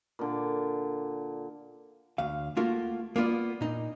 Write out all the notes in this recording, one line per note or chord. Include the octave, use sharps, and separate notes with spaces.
A#2 D3
D2 F5
A3 A#3 F4 F#4
A#3 B3 F4 D5
A#2 D#4